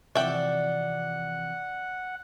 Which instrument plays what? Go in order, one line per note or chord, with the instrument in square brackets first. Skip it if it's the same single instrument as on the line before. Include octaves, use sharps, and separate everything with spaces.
[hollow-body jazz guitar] C3 E3 F3 [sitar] D5 [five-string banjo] E5 G5 [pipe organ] F#5